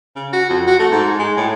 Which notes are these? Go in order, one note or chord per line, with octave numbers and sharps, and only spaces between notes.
C#3
F#4
F2
F#4
A3
G#2
G#3
A2